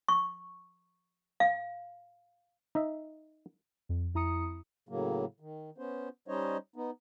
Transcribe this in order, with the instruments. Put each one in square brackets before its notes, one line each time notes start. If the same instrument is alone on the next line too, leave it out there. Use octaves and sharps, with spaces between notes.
[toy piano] C#6
F5
[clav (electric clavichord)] D#4 D#5 E5
[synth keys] F2
F2 E4 A#5 D#6 C#7
[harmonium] A2 C#3 F#3 A#3
D#3
B3 C#4 C5
G3 C#4 D#4 C5 C#5 D#5
B3 D#4